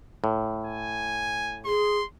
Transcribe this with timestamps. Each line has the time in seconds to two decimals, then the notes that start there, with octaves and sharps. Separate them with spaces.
0.24 A2
0.66 G#5
1.65 G#4 C6